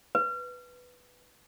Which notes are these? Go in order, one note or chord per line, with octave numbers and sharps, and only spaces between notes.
B4